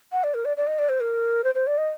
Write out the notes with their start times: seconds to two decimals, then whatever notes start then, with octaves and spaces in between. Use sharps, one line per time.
0.12 F#5
0.24 D5
0.34 A#4
0.45 D5
0.57 D5
0.67 D#5
0.79 D5
0.89 C5
1.00 A#4
1.44 C5
1.55 C5
1.67 D5
1.78 D#5